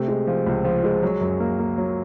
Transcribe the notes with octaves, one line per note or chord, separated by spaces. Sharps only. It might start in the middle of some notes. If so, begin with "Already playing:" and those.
Already playing: C3 A3
G#3
F3
C#2
F3
G#3
F#3
F#2
A#3
A#3
F#3